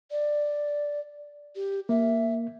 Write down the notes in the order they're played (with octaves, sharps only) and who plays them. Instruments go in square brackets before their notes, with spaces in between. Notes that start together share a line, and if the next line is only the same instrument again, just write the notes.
[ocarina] D5
G4
[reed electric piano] A#3 [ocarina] E5